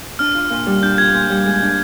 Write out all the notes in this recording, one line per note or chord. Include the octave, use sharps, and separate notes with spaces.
D4 F6
F4
A#2
G3
D4 G6
F4 G#6
A#2
G3
G#3
D4